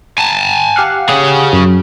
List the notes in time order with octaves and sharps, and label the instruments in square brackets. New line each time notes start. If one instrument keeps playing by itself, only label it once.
[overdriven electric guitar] G#5 A5
[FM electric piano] G4 F5 F#5
[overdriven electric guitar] C#4 G#4
[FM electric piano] F#2